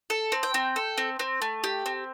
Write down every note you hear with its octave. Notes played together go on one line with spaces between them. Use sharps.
A4
C4
G5
C4
A4
C4
C4
A3
G4
C4